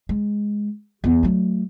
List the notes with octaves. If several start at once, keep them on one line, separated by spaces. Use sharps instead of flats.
G#3
E2 B3
F#3 A3